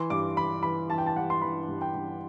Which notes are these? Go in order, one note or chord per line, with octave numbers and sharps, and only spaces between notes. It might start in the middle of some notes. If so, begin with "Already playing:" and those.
Already playing: E3 C6
G2 D6
E3 B5
E3 B5
E3 A5
G5
A5
G2 F#5
C6
E3 B5
G2
G5
G2